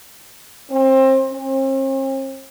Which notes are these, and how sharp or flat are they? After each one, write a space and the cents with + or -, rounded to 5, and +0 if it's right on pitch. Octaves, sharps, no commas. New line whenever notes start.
C4 +25
C4 +45